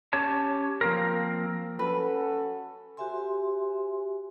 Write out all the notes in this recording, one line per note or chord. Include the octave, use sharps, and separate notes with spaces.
C#4 G4 C#5 A5
F3 A#3 C4 A#4
C#4 F#4 A4 B4
F#4 G4 C5 E5 G#5 C6